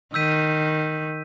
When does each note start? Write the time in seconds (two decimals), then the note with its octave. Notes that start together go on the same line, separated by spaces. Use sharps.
0.14 D#3 E6 G6 B6 D#7